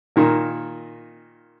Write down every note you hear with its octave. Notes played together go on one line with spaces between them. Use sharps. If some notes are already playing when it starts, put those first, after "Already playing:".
A#2 D#3 A#3